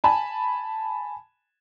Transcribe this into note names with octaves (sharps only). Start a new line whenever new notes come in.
G#5 A5 B5